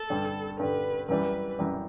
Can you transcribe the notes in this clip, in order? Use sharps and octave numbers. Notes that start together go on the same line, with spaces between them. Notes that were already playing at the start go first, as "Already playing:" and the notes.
Already playing: A4
G2 D3 G3
G2 D3 G3 B4
F#2 E3 G3 B4
F#2 E3 G3